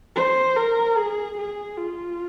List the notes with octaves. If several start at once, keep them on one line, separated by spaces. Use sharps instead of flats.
C5
A#4
G#4
G#4
F4